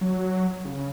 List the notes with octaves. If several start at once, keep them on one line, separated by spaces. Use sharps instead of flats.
F#3
C#3